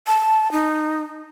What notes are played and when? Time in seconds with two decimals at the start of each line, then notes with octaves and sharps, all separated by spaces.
0.07 A5
0.52 D#4